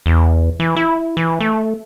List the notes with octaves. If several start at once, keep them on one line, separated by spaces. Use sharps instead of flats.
E2
E3
E4
E3
A3